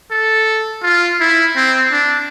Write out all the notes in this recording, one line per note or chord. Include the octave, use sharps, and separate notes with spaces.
A4
F4
E4
C4
D4